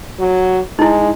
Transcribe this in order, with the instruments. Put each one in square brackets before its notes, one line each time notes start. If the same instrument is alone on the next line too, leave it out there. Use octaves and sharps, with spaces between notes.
[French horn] F#3
[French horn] G#3 [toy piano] D#4 E4